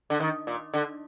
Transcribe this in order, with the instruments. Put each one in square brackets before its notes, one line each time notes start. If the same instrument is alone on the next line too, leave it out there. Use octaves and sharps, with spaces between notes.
[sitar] D3
D#3
A#2
D3